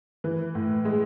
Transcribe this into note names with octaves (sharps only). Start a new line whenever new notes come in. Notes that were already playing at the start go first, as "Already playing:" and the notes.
E3
A2
G#3